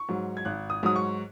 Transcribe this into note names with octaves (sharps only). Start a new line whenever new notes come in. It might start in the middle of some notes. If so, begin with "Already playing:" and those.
Already playing: C#6
G#2 F#3
G#6
G#1 F#6
D#6
G#2 F#3 D#6
C#6